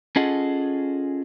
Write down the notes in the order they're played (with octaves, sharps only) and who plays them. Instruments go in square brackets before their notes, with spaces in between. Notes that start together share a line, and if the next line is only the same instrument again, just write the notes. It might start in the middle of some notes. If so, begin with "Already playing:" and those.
[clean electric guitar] C#4 F4 G#4 A4 D#5 F#5